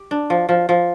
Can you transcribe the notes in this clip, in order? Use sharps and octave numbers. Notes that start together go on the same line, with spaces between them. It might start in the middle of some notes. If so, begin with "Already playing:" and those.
Already playing: G4
D4
F3
F3
F3